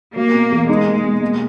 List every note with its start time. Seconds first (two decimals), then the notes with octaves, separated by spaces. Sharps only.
0.16 F#3 A#3
0.34 B2
0.52 E2
0.69 G#3 D#4
0.87 A#3
1.04 B2
1.22 A#3